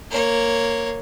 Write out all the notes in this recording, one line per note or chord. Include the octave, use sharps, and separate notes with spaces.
A#3 C#5